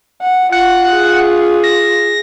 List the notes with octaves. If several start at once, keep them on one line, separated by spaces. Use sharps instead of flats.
F#5
F4 F#5
G#4
A#6